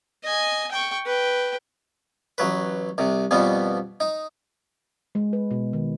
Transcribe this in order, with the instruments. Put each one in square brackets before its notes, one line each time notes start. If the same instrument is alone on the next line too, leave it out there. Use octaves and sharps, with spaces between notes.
[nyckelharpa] D#5 G#5
G5 C#6
B4 G5
[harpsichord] A1 F#3 B4
C2 C3
F2 B2 G3 B3
D#4
[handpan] G#3
B4
B2
D#3